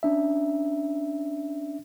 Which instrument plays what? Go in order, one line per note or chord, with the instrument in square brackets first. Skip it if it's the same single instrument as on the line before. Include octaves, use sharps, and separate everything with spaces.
[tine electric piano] C#4 D4 E5